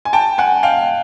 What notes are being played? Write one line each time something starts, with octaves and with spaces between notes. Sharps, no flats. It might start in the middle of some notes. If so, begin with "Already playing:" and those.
G#5
G5 A5
F#5 G#5
F5 G5